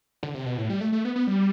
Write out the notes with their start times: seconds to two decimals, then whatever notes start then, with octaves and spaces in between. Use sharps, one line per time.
0.23 D3
0.34 C3
0.46 B2
0.58 A2
0.70 G3
0.81 A3
0.92 A3
1.05 B3
1.16 B3
1.27 G3